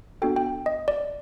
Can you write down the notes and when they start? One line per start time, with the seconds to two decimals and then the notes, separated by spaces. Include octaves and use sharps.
0.22 B3 D4 F#4 A4 G5
0.36 G5
0.66 D#5
0.88 D5